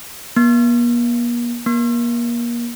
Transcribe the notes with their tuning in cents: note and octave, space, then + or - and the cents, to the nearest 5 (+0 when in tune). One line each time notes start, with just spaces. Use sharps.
A#3 +45
A#3 +30